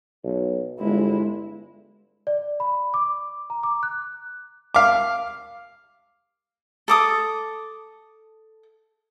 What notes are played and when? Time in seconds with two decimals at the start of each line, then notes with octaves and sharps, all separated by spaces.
0.24 B1
0.79 G1 G#3 E4
2.27 D5
2.60 B5
2.94 D6
3.50 A#5
3.63 D6
3.83 F#6
4.74 F5 D6
6.88 A4 D6 D#6